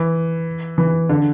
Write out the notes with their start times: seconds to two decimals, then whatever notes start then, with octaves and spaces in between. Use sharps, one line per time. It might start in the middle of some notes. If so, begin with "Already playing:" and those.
Already playing: E3
0.78 E3
1.09 D3